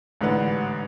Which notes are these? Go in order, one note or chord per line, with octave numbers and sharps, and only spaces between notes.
A1 G#2 D3 B4 F#5